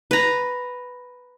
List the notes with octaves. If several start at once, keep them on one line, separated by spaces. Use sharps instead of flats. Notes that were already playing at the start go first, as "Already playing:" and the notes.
B4 A#5